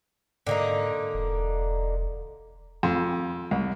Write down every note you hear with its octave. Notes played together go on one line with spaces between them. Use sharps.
G#2 D3 A#3 D#4
E1
F2
C2